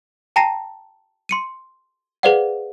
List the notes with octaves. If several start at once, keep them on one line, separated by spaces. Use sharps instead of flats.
G5 A5 A#5 A#6 C7 D#7
C6 C#7 D#7
G#4 B4 C5 D5 F5 F#5